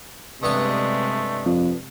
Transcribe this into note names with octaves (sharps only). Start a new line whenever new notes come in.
G2 C3 G#3 A3 B3 G#5
F2